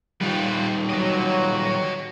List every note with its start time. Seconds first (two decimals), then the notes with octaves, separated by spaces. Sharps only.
0.21 D#3 G3 F4 B4
0.90 F#3 F#4 C#5 D#5